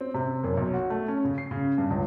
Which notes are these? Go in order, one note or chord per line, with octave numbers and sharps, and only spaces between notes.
C4
C3
F#1
B1
F#4
A3
C#4
C#3
C7
C#3
G2
C#2